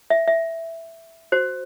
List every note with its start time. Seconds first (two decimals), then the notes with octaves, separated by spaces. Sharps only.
0.10 E5
0.28 E5
1.32 F#4 C5